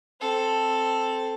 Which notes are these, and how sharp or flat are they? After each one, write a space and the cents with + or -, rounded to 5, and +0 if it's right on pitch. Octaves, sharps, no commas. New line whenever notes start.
C4 +0 A4 +0